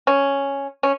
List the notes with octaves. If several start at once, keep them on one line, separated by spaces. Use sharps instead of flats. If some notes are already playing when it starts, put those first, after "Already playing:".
C#4
C#4